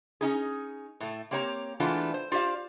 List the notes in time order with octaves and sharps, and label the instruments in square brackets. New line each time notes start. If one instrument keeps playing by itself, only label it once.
[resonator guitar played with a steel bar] C#4 D#4 G#4
A2 A3
A#3 C4 G4 C#5 A#5
E3 G#3 A3 B3 D4 F4
C5
F4 G4 C5 D5 F5